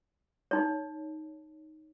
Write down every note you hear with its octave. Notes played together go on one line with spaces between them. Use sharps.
D#4 C#5